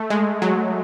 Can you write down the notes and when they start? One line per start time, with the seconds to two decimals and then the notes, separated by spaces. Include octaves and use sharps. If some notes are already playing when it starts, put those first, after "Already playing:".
Already playing: A3
0.10 G#3
0.42 F#3